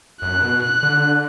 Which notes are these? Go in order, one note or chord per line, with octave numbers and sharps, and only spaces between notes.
F#2 F#6
B2
F#6
D3